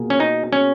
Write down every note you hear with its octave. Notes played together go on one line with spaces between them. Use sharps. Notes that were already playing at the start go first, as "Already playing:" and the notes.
Already playing: B2 A#3 F4 G#4
C#4
D#4
C#4